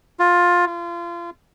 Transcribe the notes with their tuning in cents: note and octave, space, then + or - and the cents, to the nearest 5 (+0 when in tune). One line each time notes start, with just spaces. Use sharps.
F4 +15
F4 -30